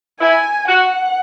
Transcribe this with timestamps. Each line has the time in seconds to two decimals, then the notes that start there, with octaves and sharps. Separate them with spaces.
0.21 E4 G#5
0.68 F#4 F#5